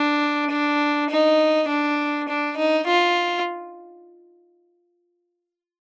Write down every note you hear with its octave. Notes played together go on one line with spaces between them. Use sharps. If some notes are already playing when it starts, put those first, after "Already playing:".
Already playing: D4
D4
D#4
D4
D4
D#4
F4